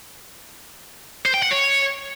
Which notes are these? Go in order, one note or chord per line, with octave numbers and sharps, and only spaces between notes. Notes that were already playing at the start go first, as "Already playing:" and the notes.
C5
G5
F#5
C#5